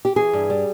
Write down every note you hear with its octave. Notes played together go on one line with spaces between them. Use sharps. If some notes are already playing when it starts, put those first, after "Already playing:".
G4
E3 G#4
G2
G3